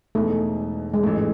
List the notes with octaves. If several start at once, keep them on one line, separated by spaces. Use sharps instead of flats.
E1 E2 B2 G#3 A3 D#4
G#3
A1 G#2 E3 A3